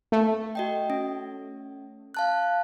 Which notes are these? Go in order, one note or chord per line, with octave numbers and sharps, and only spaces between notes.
A3
F#4 D#5 G5
C#4
F5 A5 F#6